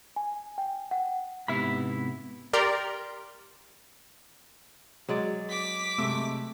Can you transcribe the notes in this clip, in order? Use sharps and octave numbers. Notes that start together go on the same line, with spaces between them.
G#5
G5
F#5
G#2 C3 B3 E4 E5 B5
G4 A#4 D5 G5 A#5 C6
F#3 G#3 D5
D6 B6
C3 G#3 A3 E5